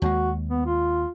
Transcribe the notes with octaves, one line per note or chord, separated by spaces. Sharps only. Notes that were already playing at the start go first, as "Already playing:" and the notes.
D#2 G#3 F#4
B3
F4